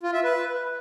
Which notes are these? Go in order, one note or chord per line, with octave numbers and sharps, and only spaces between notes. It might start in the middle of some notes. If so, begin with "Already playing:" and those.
F4
E5
B4